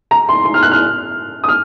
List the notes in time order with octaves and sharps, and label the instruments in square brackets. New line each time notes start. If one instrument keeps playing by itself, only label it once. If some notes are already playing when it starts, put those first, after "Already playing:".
[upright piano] A#5
C6
C6
F6
F#6
F6
D#6
F6